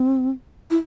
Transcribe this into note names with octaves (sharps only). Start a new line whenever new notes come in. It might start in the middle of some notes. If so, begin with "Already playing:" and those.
Already playing: C4
E4